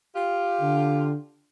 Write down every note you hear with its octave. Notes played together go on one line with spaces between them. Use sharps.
F4 G4
D3